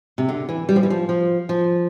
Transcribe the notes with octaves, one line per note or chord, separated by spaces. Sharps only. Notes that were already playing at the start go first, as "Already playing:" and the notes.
C3
D3
E3
G3
F3
E3
F3
F3
F3